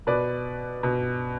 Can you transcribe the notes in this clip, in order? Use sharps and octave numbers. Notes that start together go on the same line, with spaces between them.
B2 B4 D5
B2